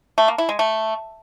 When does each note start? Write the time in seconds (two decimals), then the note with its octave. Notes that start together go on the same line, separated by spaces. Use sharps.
0.18 A3
0.28 A#3
0.38 E4
0.49 G#3
0.59 A3